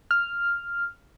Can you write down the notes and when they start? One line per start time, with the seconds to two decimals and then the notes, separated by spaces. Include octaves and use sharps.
0.11 F6